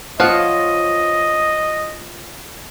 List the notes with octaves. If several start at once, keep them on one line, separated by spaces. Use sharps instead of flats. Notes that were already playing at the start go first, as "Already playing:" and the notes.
F3 F4 C#5 D#5 F5 F#5